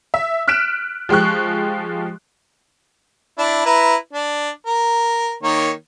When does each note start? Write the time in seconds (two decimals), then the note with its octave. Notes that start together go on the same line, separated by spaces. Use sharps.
0.14 E5
0.48 F6 F#6 B6 D7 E7
1.09 F3 G#3 G4 C#6 F#6
3.38 D4 E4
3.66 E4 B4 A#5
4.13 D4
4.66 A#4
5.43 D#3 A#3 C#5